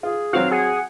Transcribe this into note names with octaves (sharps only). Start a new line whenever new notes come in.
F4 G#4
F#3 C4 F#4 F5
G#4 F#5